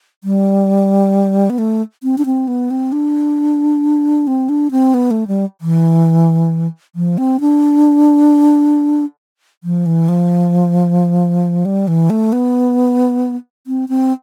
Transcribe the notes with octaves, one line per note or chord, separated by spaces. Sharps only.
G3
B3
A3
C4
D4
C4
B3
C4
D4
C4
D4
C4
B3
A3
G3
E3
F3
C4
D4
F3
E3
F3
G3
E3
A3
B3
C4
C4